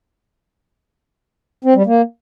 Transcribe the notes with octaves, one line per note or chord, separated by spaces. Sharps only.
C4
G3
A#3